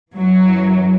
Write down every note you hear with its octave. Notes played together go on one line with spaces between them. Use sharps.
F#2 E3 F#3